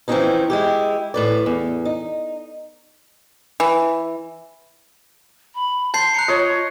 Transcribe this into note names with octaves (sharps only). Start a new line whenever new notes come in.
E3 F3 C4 C#4 D#4 E4
G#3 E4 G4
A2 B4 D5
E2
D#4
E3
B5
A5 C6 G6 C7
A#5 F#6 C#7
F4 C#5 D#5